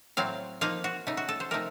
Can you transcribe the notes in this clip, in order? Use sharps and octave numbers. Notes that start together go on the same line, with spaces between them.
A2 F#3 C4 F5
F3 A#3 D#4 F5
F#4
C#3 A3 D#4
F#4
A4
C5
C3 F3 A3 D#4 A#4